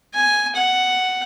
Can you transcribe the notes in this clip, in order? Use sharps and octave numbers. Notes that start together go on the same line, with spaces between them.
G#5
F#5